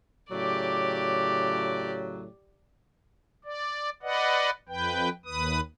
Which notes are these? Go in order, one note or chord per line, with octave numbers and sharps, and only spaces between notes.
A2 C#3 F#3 G4 D5
D5
B4 D5 D#5 F#5
F2 B4 G5
D#2 B4 D#6